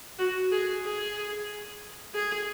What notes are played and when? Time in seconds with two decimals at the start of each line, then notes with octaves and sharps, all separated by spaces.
0.18 F#4
0.52 G#4
0.84 G#4
2.14 G#4